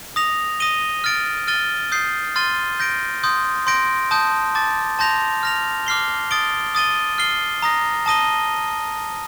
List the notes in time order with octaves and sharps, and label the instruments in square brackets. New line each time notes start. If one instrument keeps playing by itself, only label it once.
[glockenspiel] D#6 A#6 F7
D#6 A#6 D#7 G7
F6 A6 D7
F6 A6 D#7 G7
D#6 G6 C7
C6 F6 A6 D#7 G7
G6 A#6 D7
C6 D#6 G6
C6 G6 A#6 D7
A5 D#6 G6
A5 D6 A6
A5 C6 G6 A#6 F7
F6 A#6 F7
D6 F6 C7 G7
D#6 A6 D7 G7
D#6 A6 D#7 G7
F6 C7 G7
A#5 D#6 A#6
A5 D#6 A#6 D#7 G7